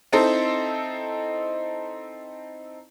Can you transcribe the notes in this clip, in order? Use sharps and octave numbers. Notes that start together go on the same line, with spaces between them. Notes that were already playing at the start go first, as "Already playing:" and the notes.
C4 D#4 E4 A4 C5